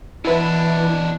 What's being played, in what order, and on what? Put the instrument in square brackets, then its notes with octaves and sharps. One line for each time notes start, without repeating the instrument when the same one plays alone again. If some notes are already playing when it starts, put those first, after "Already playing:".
[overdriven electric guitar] B2 D4 [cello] E3 [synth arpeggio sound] E4 B4